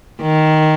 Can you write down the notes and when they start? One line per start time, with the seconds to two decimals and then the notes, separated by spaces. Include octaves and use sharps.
0.22 D#3